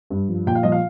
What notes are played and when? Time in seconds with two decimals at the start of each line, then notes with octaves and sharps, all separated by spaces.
0.10 G2
0.29 F3
0.47 A#2 G5
0.55 F5
0.63 F3 D#5
0.72 F5